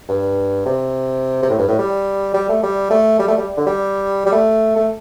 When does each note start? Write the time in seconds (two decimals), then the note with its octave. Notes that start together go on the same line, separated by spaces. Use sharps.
0.09 G2
0.66 C3
1.42 C3
1.49 A2
1.58 G2
1.68 A2
1.78 G3
2.34 G3
2.49 A3
2.63 G3
2.90 A3
3.19 G3
3.28 A3
3.38 G3
3.57 D3
3.66 G3
4.26 G3
4.32 A3
4.76 A3